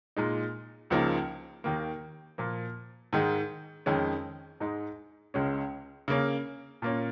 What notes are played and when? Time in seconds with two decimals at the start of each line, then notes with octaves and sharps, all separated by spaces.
0.16 A#2 G#3 D#4
0.90 C#2 C#3 F3 A#3 D#4
1.64 D#2 D#3 A#3
2.38 A#2 F3 A#3
3.13 G#2 D#3 G#3
3.86 F2 D#3 G#3 C#4
4.60 G#2 G#3 D#4
5.34 C#2 C#3 G#3 C#4
6.08 C#3 A#3 C#4
6.82 A#2 A#3 C#4